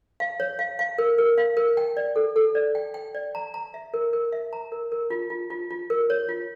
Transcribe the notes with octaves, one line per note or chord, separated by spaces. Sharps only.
F5
C#5
F5
F5
A#4
A#4
F5
A#4
G5
D5
A4
A4
D5
G5
G5
D5
A#5
A#5
E5
A#4
A#4
E5
A#5
A#4
A#4
F4
F4
F4
F4
A#4
C#5
F4